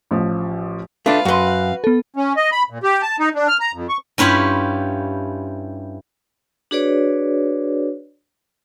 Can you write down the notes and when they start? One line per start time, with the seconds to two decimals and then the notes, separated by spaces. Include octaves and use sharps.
0.11 A1 F3
1.06 A3 D4 F4 B4 F5
1.25 F#2 F#4 B4 C6
1.47 F#5
1.84 B3 A4
2.16 C#4
2.37 D#5
2.52 B5
2.70 A#2
2.83 G4
3.02 A5
3.19 D#4
3.35 D4
3.48 F6
3.60 A#5
3.73 F2
3.89 C#6
4.18 G2 C#4 E4 F4 G4 B5
6.71 D4 F#4 G#4 B4 C#5 D5